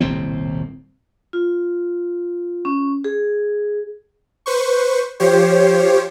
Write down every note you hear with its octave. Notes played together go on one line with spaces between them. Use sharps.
D#1 C2 A2 C4
F4
C#4
G#4
B4 C5 C#6
F3 G4 C5 C#5